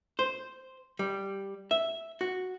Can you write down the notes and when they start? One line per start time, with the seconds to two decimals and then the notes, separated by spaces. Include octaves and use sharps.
0.19 C5
0.99 G3
1.71 E5
2.21 F#4